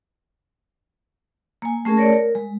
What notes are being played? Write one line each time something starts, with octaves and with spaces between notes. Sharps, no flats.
A#3 G#5
A3 C#4 G#4 A#4 A5
A#4 C#5 D5
A#4
G#3